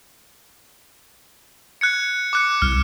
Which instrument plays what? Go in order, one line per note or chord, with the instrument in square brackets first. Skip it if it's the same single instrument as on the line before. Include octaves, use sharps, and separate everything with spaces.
[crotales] F#6 G#6 C#7
D6 F#6 C#7
[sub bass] C2 [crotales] F6